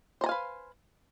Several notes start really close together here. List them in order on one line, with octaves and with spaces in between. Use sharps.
C5 A#5 G#5 F5 B4